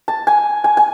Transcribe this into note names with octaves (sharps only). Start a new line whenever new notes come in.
A5
G#5
G#5
G#5